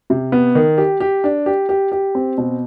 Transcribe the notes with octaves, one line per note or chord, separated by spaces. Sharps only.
C3
B3
D#3
G4
G4
D4
G4
G4
G4
C4
B2